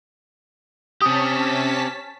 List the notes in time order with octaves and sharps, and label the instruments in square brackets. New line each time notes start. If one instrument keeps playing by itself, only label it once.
[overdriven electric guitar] C4 G4 [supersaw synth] C#4 A5 B6 [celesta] D#6